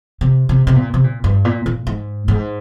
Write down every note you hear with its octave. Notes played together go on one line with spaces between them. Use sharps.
C3
C3
C3
A#2
C3
A#2
G2
A#2
A#2
G#2
G#2